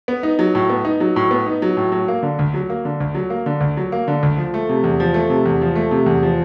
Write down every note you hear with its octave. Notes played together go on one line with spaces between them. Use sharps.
B3
D#4
F#3
A2
B3
D#4
F#3
A2
B3
D#4
F#3
A2
F#3
A#3
D3
D2
F#3
A#3
D3
D2
F#3
A#3
D3
D2
F#3
A#3
D3
D2
F3
A3
C3
E2
F3
A3
C3
E2
F3
A3
C3
E2
F3